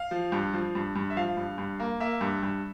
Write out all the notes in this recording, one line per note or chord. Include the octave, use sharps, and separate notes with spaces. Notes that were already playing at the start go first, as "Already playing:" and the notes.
Already playing: F5
F3
G2
F3
G2
G2
E5
F3 F5
G2
G2
A#3
A#3 E5
G2
G2